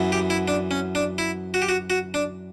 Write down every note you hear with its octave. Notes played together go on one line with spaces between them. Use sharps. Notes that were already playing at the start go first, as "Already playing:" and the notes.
Already playing: F#2 E3 B3
G4
E4
D4
C#4
D4
E4
F#4
G4
F#4
F#4
D4